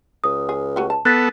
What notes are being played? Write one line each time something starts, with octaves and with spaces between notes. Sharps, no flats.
C#2 D#6
G#4
A3 F#4 G4
A5
B3 A4 F#6 A6 B6